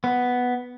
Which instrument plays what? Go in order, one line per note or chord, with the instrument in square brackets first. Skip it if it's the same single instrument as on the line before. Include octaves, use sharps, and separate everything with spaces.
[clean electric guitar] B3